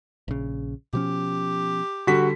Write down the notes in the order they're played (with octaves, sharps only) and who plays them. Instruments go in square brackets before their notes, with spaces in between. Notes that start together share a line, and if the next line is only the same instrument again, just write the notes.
[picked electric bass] A#1 C#3
[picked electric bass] B2 F3 C#4 [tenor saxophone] G4
[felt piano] D3 G3 [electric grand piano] F#4 B6